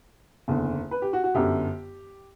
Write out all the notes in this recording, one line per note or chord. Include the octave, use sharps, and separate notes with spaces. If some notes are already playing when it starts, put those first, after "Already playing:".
F#1 E2 D3
B4
G4
F#4
F#4
G1 F#2 D3 G4